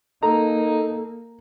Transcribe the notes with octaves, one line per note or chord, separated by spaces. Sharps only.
A#3 D#4 A4 A#5